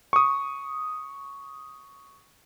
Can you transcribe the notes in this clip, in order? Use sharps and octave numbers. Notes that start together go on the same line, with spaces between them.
C#6 D#6